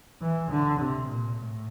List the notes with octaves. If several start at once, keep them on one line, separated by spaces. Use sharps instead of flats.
E3
D3
C3
A#2
A2